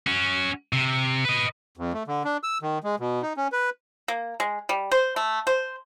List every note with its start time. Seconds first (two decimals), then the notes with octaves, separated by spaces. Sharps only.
0.07 C#4 F#4
0.73 C3
1.25 B4 D#5
1.77 F2
1.93 A3
2.07 D3
2.25 D4
2.43 E6
2.62 D#3
2.84 G#3
2.99 B2
3.22 D#4
3.37 C#4
3.52 B4
4.08 A#3
4.40 G#3
4.69 G3
4.92 C5
5.16 A3
5.47 C5